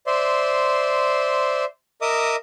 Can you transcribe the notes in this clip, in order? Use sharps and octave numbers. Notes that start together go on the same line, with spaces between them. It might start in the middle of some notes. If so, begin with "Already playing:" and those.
C5 D5 E5 C6
A#4 D#5 E5 D6 D#6